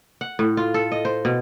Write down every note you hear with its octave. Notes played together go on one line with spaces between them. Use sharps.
F#5
A2
F4
A4
D#5
C5
B2